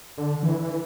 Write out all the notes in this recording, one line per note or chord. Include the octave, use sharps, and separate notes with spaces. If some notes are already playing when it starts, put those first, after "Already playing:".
D3
E3
E3